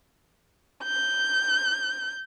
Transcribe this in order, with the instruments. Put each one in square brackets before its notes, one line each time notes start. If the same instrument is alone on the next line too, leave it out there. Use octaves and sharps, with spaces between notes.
[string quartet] G6